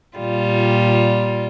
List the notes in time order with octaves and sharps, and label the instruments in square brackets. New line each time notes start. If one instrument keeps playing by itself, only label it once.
[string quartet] A#2 G3 F4